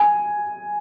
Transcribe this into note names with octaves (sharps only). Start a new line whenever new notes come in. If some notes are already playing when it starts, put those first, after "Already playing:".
Already playing: G#5